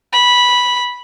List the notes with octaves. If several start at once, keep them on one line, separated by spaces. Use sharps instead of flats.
B5